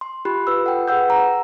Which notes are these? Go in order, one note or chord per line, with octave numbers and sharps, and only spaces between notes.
C6
F4 G4 B5 F#6
F4 B4 E6
A4 F#5 G5
G#4 B4 F#5 E6 G6
A#5